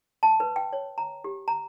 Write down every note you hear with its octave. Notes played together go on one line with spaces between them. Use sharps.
A5
B4
G5
C#5
A#5
G4
A#5